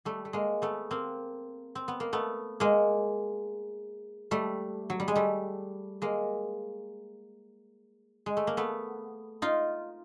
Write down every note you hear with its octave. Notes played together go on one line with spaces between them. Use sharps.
G3 A3
A3
G#3 A#3
A3 B3
A#3 C4
C4
B3
A#3
A3 B3
G#3 A#3
G3 A3
F#3
G3
G#3
G3 A3
G#3 A#3
G#3
A3
A#3
A3 B3
D#4 F4